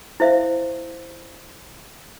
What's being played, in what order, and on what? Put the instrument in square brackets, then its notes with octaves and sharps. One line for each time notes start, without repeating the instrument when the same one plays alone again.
[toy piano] E4 C5 E5 F5